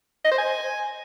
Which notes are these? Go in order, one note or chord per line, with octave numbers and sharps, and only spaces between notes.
D#5
C5
G#5